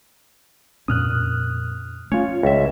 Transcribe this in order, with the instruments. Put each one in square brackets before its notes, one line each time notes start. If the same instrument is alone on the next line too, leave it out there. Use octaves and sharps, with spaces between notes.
[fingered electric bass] F2 A#2 C#4 [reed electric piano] D#6 F6 F#6
[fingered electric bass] A3 [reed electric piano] C#4 F4 [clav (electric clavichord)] C#5
[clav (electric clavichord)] C#2 E5